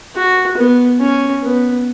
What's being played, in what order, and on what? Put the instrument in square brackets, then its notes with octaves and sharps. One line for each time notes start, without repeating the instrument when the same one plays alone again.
[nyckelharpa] F#4
B3
C#4
B3